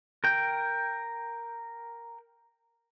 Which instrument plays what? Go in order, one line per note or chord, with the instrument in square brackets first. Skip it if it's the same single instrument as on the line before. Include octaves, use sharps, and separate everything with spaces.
[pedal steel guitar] A#4 G5